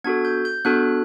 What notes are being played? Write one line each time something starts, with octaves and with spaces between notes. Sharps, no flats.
B3 D4 F#4 A4 G#6
G6
G6
B3 D4 F#4 A4 F#6